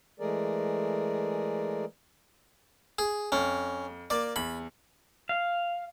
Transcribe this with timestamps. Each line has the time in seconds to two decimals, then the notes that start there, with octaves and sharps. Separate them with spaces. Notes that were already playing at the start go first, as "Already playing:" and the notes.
0.20 E3 G#3 A3 G#4 A#4 D5
2.99 G#4
3.32 F2 C#4
4.10 A#3 D5 D6
4.36 E2 B5
5.29 F5